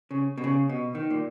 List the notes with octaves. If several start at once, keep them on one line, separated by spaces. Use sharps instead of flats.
C#3
B2
C#3
B2
D#3
A#2